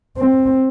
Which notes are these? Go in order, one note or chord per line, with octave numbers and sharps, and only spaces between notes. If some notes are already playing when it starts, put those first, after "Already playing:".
C4